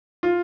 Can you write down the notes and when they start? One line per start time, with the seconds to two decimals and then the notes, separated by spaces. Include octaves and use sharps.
0.23 F4